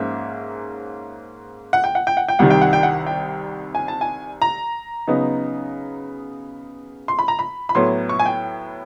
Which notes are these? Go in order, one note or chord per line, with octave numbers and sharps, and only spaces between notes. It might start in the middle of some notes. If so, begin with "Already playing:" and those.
Already playing: G#2 F3 A#3 C#4 E5
F#5
G5
F#5
G5
F#5
G5
C2 C3 D#3 G3 F#5
G5
F#5
G5
F#5
G5
G#5
A5
G#5
A#5
C#3 F#3 B3 D#4
C6
B5
A#5
B5
B5
A2 F#3 B3 C6
C#6
G#5
G5